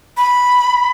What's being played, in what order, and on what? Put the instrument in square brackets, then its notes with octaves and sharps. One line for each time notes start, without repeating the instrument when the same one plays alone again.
[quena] B5